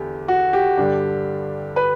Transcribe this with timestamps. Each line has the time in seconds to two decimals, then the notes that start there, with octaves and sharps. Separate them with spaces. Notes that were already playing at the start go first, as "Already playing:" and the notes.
Already playing: E2 D3 A3 G4
0.28 F#4
0.53 G4
0.77 G2 D3 G3 D4
1.76 B4